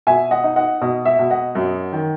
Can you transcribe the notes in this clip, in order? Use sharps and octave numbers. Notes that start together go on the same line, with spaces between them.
B2 E5 G#5
D#5 F#5
D#4
D#5 F#5
B2 D#5
E5
B2
D#5 F#5
F#2
D#3